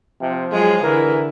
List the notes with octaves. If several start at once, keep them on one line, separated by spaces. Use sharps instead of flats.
C3 F3
F#3 G#3 F4 G#4
D3 E3 E4 A#4